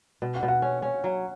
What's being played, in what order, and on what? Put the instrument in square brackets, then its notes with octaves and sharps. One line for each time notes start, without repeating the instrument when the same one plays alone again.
[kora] B2
[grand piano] F#5
[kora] B2
[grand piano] F#5
[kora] C#4
C#4
F#3